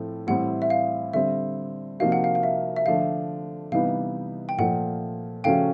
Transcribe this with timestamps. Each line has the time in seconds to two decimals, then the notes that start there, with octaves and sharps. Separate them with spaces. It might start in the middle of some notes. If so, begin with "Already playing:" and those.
Already playing: A2 F3 A3 C4 E4
0.27 A2 E3 G3 C4 E4 F#5
0.62 E5
0.70 F5
1.14 D3 G3 C4 E5
2.00 C3 F3 A#3 D#4 F#4 F5
2.12 F#5
2.24 F5
2.35 F5
2.43 E5
2.76 E5
2.86 D3 F3 A3 D4 F5
3.72 C3 E3 G3 B3 D#4 F5
4.49 G5
4.58 A#2 F3 A3 F#5
5.44 C#3 F3 A3 C#4 F#4 F5 G5